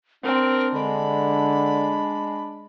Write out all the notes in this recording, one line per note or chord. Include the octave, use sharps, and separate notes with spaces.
C4 D4 A#4
D3 G#3 B5